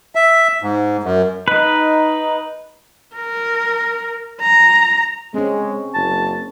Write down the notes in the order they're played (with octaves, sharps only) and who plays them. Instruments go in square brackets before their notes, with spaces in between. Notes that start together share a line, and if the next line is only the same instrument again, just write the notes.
[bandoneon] E5
G#2
F#2
[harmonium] D#4 [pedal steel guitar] B4
[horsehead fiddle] A#4
A#5
[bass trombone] G#3 [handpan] C4 C#4
[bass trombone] F#1 [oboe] A5